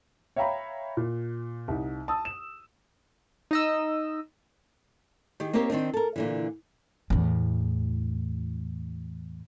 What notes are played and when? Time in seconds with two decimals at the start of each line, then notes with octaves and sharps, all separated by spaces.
0.36 C#5 E5 F5 G5 A#5 B5
0.97 A#2
1.68 C2 D#4
2.08 A5 D#6 E6
2.25 E7
3.51 D#4 D#5 E6
5.40 D#3 G4 G#4
5.53 A#3 C4 D#4 G4 A#4 C#5
5.70 D#3 C4 D4 D#4
5.94 A4 A#4
6.16 A#2 D3 E3
7.10 E2 A2